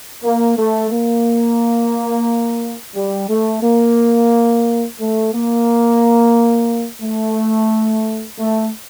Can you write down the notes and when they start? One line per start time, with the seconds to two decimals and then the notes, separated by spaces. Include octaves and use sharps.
0.23 A#3
0.57 A3
0.91 A#3
2.94 G3
3.28 A3
3.62 A#3
4.99 A3
5.32 A#3
7.02 A3
8.38 A3